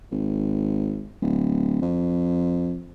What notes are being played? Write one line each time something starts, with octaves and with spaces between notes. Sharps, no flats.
G#1
D1
F2